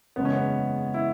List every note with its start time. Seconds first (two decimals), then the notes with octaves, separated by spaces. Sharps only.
0.16 F#1 E2 C#3 G#3 B3
0.25 C#4
0.33 B3
0.94 E4